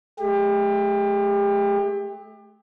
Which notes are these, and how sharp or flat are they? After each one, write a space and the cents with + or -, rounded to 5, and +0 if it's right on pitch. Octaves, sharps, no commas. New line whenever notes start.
A3 -40 G4 +30